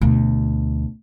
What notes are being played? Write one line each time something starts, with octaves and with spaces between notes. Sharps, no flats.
D2 B2